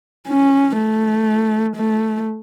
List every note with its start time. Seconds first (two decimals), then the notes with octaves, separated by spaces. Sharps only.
0.28 C#4
0.78 A3
1.76 A3